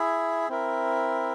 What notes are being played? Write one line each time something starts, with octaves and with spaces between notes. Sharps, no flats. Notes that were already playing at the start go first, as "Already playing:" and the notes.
Already playing: E4 G#4 E5
C4 E4 A#4 E5